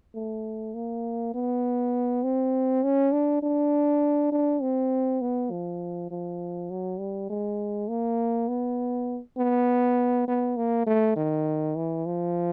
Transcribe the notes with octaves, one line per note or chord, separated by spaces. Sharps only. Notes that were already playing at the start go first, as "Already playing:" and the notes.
A3
A#3
B3
C4
C#4
D4
D4
D4
C4
B3
F3
F3
F#3
G3
G#3
A#3
B3
B3
B3
A#3
A3
D#3
E3
F3